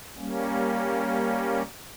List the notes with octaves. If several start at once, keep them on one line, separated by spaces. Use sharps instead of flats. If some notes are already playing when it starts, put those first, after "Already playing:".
G3 A#3 C#4